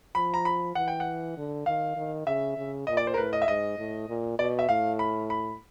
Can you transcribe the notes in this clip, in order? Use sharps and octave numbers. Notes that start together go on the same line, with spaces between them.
F3 B5
A#5
B5
E3 F#5
G5
F#5
D3
D#3 F5
D#3
C#3 E5
C#3
A#2 D#5
D5
C5
A#4
A2 B4
D#5
E5
G#2 D#5
A2
A#2
B2 D5
E5
A2 F5
B5
B5